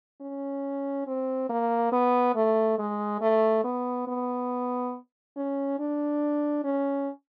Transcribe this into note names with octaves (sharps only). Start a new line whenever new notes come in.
C#4
C4
A#3
B3
A3
G#3
A3
B3
B3
C#4
D4
C#4